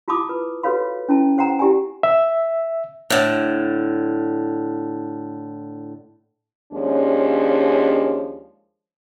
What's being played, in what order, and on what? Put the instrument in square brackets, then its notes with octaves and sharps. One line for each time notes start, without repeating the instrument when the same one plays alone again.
[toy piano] E4 F4 A5 B5 D6 D#6
B4
F#4 A4 B4 C#5 F5 B5
C#4 E4 A5
C5 F#5 G5 A#5
E4 G4 D5 G#5
[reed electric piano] E5
[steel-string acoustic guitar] A2 D3
[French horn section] D#2 F3 G#3 C#4 D4 C#5